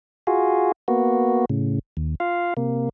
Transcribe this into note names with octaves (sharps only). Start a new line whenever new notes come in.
F4 F#4 G#4
A#3 B3 F#4
A2 C#3
D#2
F4 F5
C3 A#3